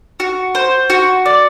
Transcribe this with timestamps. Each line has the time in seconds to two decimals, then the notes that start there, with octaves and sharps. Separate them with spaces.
0.20 F#4
0.55 C5
0.90 F#4
1.26 D5